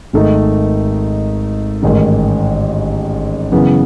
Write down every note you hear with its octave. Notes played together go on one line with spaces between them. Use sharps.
G#1 G#2 D#3 A3 D#4
A1 G#2 D#3
F#2 C#3 E3 B3